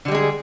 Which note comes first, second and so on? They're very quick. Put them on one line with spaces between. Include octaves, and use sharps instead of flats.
D3 G3 G#3 G#4